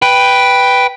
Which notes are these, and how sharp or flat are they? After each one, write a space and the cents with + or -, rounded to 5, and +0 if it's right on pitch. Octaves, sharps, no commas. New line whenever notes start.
B4 +0 G5 +0